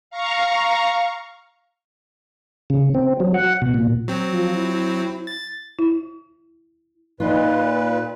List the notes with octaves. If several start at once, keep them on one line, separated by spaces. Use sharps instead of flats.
F5 A#5 C#6
C#3
C4
F#3
F#5
B2
A#2
F#3 C4
F3
E4
A6
E4
A#2 D#4 F4 B4